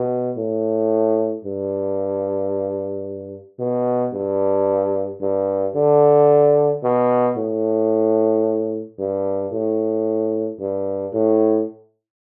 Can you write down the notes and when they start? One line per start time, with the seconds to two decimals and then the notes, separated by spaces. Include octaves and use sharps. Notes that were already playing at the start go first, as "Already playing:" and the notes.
Already playing: B2
0.37 A2
1.45 G2
3.60 B2
4.14 G2
5.21 G2
5.76 D3
6.84 B2
7.37 A2
8.99 G2
9.52 A2
10.60 G2
11.14 A2